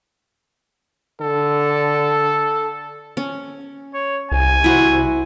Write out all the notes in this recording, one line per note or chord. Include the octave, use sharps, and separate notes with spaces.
D3 A4
C#4
C#5
C2 G#5
E4 F#4 C5